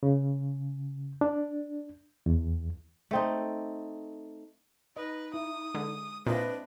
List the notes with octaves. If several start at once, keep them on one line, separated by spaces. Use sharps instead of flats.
C#3
D4
E2
A3 C4 D#4
D#4 B4 D#5
E4 D#6
D3 G#3
A#2 C4 D4 E4 B4 D#5